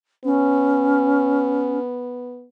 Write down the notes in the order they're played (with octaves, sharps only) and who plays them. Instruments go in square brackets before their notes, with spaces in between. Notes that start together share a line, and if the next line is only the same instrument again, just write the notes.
[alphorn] B3 [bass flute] C#4